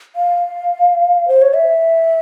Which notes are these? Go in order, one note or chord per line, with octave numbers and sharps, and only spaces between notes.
F5
C5
C#5
E5